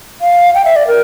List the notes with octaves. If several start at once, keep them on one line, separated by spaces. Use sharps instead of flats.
F5
G5
E5
D5
A#4